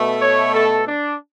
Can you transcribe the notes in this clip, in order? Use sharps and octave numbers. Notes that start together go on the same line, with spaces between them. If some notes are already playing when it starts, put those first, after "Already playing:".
Already playing: B2 A3
C#5
A4
D4